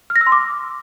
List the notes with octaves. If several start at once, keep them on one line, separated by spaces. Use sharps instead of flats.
F6
A#6
E6
C6
D6